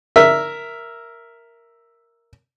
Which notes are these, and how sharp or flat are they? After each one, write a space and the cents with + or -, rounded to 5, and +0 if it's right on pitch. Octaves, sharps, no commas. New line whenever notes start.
A#4 +0 E5 +5